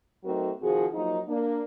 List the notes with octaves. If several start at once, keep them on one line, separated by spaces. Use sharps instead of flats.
F#3 A3 C4 D#4 F#4 A#4
C3 D#3 F3 F#4 G#4
F3 F#3 A#3 D#4
A#3 D4